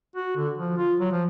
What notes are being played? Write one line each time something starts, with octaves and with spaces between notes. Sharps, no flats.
F#4
D3
F3
F4
F#3
F3